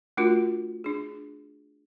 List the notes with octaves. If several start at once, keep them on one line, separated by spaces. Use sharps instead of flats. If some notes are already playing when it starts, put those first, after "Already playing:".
A3 D4 F4 F#4 A#4
D4 G#4